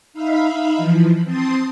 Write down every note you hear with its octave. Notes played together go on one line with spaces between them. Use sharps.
D#4 E5 F5 B5
E3 F3
C4 A5 C6 D#6